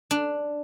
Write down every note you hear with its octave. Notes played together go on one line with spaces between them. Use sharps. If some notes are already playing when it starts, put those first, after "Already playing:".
D4